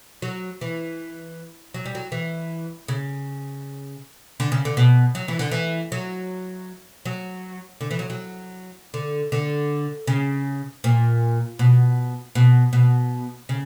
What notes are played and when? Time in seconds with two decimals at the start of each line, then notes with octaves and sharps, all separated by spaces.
0.22 F#3
0.61 E3
1.74 F#3
1.85 G3
1.95 F#3
2.12 E3
2.88 C#3
4.40 D3
4.52 C#3
4.65 D3
4.77 B2
5.15 F#3
5.28 E3
5.39 D3
5.51 E3
5.92 F#3
7.05 F#3
7.81 D3
7.91 E3
7.99 F#3
8.10 F#3
8.94 D3
9.32 D3
10.07 C#3
10.84 A#2
11.59 B2
12.35 B2
12.73 B2
13.49 C#3